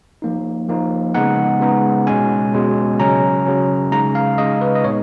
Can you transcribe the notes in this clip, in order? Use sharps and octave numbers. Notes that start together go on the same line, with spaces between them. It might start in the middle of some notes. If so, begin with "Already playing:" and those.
F3 A#3 D#4
F3 A#3 D#4
C#3 G#3 B3 D#4 F#5
C#3 G#3 B3 D#4
B2 G#3 C#4 G#5
B2 G#3 C#4
C#3 F#3 C#4 A#5
C#3 F#3 C#4
C#3 G#3 D#4 A#5
F5
C#3 G#3 D#4 D#5
B4
D#5
A#2 G#3 B3 D#4 C#5